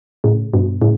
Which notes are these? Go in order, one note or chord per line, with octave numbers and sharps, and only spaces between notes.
A2 C#3
G2 B2
A2 C#3